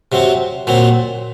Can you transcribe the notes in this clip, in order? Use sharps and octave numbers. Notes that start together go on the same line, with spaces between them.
C3 F#3 C4
A#2 F#3 C4